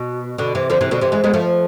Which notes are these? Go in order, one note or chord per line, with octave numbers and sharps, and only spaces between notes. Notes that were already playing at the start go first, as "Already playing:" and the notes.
Already playing: B2
B2 D3
C3 E3
D3 F3
C3 E3
B2 D3
C3 E3
E3 G#3
G#3 B3
F3 A3